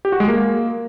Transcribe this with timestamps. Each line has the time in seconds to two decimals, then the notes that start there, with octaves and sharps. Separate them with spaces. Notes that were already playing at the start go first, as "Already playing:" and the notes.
0.05 G4
0.12 F#4
0.20 G#3
0.28 A#3